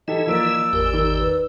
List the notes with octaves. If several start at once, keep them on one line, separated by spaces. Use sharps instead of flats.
E3 D#4 E4 G4 A4 D#5
F3 A#3 D5 E6 D7
G#1 E2 G4 A#4
D#3
B4